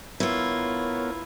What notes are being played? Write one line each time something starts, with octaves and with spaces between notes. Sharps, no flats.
B3 E4 F4 A#4 C#5